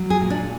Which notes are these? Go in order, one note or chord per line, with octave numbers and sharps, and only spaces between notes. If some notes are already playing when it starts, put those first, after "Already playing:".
Already playing: F#3
G#4
A#2
D4